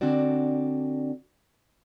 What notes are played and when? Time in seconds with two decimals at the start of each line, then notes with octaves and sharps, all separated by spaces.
0.01 D3 C4 D4 F#4 D5